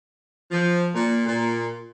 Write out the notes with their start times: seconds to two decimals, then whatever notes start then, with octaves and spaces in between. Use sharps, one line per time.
0.51 F3
0.94 A#2
1.27 A#2